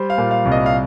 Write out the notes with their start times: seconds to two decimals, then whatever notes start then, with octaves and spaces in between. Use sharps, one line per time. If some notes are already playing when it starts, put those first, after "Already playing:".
Already playing: G3 C5
0.10 F5
0.18 A#2
0.31 F5
0.45 C2
0.52 D#5
0.66 F5